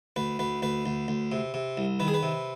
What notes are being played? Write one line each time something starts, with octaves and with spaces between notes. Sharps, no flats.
D2 B4
D2 B4
D2 B4
D2
D2
C3
C3
C2
D#3 B4
G#4
B4
C3